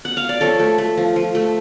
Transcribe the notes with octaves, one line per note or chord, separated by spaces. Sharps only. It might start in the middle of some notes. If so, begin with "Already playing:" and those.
F#5
F5
D5
F3 A4 C#5
A3
A3
F3
F3
A3